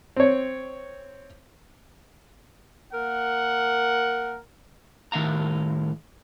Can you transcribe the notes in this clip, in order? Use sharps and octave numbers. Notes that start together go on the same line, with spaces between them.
C4 C#5
A#3 A#4 F#5
A2 D#3 E5 F5 A#5